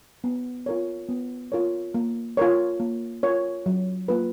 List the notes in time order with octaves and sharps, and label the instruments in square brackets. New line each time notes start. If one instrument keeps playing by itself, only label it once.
[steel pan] B3
F4 A#4 C#5
B3
F4 A#4 C#5
A#3
F4 A#4 C#5
A#3
F4 A#4 C#5
F#3
A#3 F4 B4